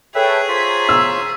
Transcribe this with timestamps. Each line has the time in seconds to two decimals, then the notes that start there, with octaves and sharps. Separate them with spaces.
0.15 G#4 A4 B4 C#5 E5 G5
0.48 F4 C5 C#5 A#5 B6
0.89 E6